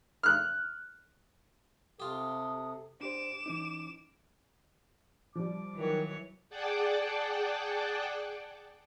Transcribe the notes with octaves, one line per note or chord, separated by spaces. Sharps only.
F6 F#6
C3 F4 G4 A4 D#6
D4 G4 C5 D6 E7
E3 C#4 D#4
F3 G3 D6
D#3 E3 F#3 C#5
G#4 D5 F#5 G5 A5 D6